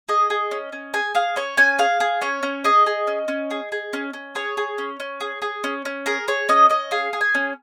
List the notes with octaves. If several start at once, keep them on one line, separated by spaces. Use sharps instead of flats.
G#4 D#5
G#4
C#4
C#4
G#4 G#5
G#4 F5
C#4 C#5
C#4 G#5
G#4 F5
G#4
C#4 C#5
C#4
G#4 D#5
G#4
C#4
C#4
G#4
G#4
C#4
C#4
G#4 C#5
G#4
C#4
C#4
G#4
G#4
C#4
C#4
G#4 A#4
G#4 C#5
C#4 D#5
C#4 D#5
G#4 F5
G#4
G#5
C#4